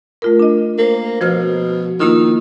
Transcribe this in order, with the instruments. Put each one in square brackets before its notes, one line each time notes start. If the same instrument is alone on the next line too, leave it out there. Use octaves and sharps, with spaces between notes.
[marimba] A3 F4 A#4
D4 D#5
[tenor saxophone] A#3 [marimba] A#4 C5
[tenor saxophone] B2 [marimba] F3 C5 F6
[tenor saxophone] D#3 [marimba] A#3 E4 F4